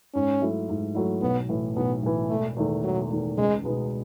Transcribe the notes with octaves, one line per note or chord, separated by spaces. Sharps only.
G#2 C#4
F#3 A3 E4
G#2
F#3 A3 E4
B1 B3
A2 E3
B1 B3
A2 E3
E1 A3
E2 D#3 A3
E1 F#3
E2 D#3 A3
C#2 G#3
B2 G#3 B3 D#4